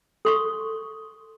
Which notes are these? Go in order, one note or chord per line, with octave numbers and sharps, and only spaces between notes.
A4 C6 C#6